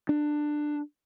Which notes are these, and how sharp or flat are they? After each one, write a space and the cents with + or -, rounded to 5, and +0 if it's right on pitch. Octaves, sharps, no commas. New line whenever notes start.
D4 +15